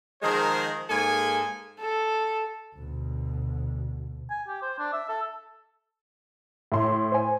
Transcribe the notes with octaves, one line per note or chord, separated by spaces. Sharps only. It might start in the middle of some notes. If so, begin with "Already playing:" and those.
D#3 F3 G#3 G#4 A#4 C5
G#2 A#3 G#4 A4 G#5
A4
D2 B2
G#5
G4
C5
D4
E5
A4
A2 E5 C6
C5 G#5